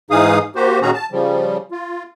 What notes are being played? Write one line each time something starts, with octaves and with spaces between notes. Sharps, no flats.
G#2 E3 D#4 G#4 F5 D#6
A#3 F#4 G4 C5
A#2 D#3 C#4 F#4 G#4 A#5
A5
C#3 F3 G3
F4